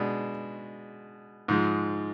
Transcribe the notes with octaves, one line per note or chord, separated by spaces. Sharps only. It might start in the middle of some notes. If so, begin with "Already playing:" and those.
Already playing: B2 G#3 D4
G#2 F3 G#3